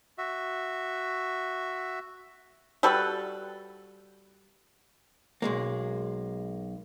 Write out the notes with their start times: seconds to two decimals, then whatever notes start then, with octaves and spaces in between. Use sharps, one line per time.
0.18 F#4 E5
2.83 G3 F#4 A4 B4
5.42 B1 G#3 A#3